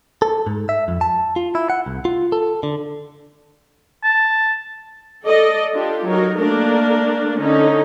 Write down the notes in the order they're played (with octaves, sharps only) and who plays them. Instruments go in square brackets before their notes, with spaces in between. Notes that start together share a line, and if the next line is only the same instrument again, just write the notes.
[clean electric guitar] A4
G#2
E5
F2
A5
F4
E4
F#5
C2
F4
A4
D3
[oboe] A5
[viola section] A4 D5 D#5
D4 F4 G4 A4
F#3 D#4 A#4
A3 A#3 D4 A#4
D3 C#4 D#4